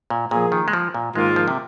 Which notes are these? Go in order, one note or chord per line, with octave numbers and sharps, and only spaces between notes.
A#2
A#2 F3 A#3 G#4
D#3
G#3
F3
A#2
G#2 D#3 G#3 A#3 F4
F3
C3